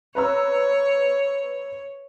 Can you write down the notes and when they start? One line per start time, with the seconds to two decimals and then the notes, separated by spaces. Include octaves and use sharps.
0.15 B4 C#5 A#5 E6